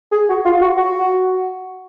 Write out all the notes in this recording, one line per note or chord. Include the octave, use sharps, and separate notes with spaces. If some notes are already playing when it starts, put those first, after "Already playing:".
G#4
F#4
F4
F#4
F#4